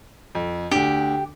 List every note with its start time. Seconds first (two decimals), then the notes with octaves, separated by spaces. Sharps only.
0.35 F2
0.71 D2 D4 G4